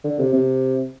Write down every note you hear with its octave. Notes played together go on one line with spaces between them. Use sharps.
D3
C3
C3